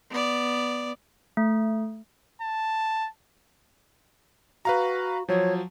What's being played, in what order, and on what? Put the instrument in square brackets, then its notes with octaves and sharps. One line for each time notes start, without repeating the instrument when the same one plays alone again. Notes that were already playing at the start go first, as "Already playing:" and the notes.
[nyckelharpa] B3 D5
[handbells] A3
[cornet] A5
[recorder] F#4 [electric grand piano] B4 F5 A#5
[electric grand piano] F3 F#3 [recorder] C#5